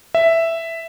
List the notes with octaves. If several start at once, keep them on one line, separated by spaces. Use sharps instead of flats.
E5